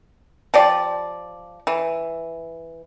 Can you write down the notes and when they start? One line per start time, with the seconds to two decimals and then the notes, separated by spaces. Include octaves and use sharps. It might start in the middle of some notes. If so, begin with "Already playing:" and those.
0.54 F3 G4 D5
1.67 E3